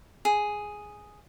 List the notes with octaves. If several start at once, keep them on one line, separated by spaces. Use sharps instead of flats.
G#4